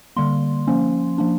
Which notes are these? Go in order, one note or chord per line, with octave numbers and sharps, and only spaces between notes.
D3 G3 A#3 C6
F3 A#3 C#4
F3 A#3 D4